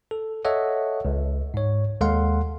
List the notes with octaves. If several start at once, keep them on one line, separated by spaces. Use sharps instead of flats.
A4
A4 C#5 D#5 E5 F#5
C#2
G#2 C#5
D#2 G#3 A4 F5 F#5 C6